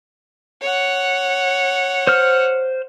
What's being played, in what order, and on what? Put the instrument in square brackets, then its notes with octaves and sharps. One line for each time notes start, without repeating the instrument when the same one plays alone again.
[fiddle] C#5 F#5
[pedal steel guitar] C5 F6